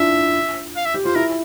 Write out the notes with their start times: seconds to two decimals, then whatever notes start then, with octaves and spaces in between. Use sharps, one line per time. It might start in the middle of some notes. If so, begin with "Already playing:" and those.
Already playing: D4 E4 F4 E5
0.76 F5
0.85 E5
0.94 G4
1.05 F4 C5
1.15 E4 A#4